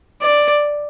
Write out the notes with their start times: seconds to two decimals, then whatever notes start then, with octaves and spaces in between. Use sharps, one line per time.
0.22 D5